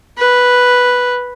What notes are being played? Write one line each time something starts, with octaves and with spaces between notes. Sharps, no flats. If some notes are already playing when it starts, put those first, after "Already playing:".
B4